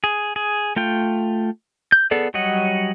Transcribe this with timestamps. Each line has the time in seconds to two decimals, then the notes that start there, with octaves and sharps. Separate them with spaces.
0.04 G#4
0.36 G#4
0.76 A3 F4 G5
1.92 G6
2.11 B3 G#4 A4 D5
2.34 F#3 G3 C#5 D#5 F#5